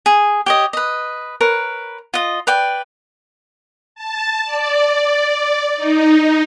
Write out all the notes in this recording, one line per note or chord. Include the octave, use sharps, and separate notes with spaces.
G#4
G4 C#5 D#5
B4 D#5
A#4 B4 C#5
F4 D#5
B4 D5 G5
A5
D5
D#4